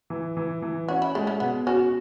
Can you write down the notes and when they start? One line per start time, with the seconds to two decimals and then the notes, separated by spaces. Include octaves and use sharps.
0.10 E3
0.37 E3
0.62 E3
0.88 C#4 F#4
1.02 E4
1.15 G#3 A3
1.27 A3
1.40 B2 B3
1.67 C#4 F#4